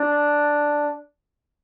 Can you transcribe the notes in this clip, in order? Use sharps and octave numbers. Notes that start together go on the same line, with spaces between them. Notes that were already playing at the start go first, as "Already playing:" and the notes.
Already playing: D4